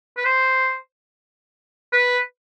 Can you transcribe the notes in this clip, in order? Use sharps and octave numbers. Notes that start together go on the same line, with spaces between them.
B4
C5
B4